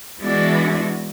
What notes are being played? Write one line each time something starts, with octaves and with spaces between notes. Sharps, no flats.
E3 G#3 B3 D4 E4 F#4